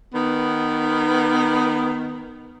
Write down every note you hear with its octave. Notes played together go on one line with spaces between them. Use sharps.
D#3 B3